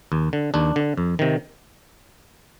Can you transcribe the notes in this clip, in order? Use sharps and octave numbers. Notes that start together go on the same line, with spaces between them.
D#2
D3
D#2 D4
D3
F2
C3 D#3